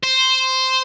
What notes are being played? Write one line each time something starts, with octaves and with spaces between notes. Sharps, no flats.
C5